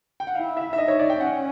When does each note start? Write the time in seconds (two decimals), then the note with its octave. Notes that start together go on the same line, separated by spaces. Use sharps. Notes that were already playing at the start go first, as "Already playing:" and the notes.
0.20 G5
0.27 F#5
0.35 E4 F5
0.57 E5
0.73 E5
0.78 D#4 D#5
0.88 C#5
0.99 D5
1.10 G5
1.20 C#4 F#5